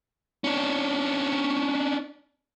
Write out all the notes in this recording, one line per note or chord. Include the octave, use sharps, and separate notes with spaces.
C#4 D4